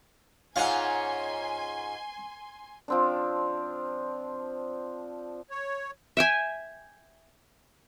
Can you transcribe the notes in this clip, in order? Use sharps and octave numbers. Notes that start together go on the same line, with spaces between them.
G#2 C#4 F4 F5 F#5 G#5 C6
F3 C4 D4
C#5
E5 G5 G#5